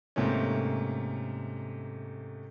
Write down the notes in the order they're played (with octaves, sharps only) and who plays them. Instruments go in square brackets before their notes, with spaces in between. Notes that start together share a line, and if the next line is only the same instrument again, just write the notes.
[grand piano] G#2 C3 A3 A#3 C#4